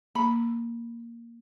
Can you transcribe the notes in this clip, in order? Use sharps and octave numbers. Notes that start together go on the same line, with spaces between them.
A#3 B5